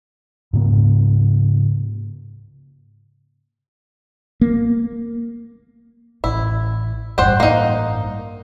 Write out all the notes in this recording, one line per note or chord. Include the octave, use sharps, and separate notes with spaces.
G#2 C#3 A#3
A#3
A1 E4
A1 G2 C5 F#5 G5
A#3 D#4